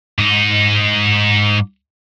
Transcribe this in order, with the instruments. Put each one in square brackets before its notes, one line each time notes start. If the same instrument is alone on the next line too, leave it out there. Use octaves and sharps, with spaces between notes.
[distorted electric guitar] G#2 D#4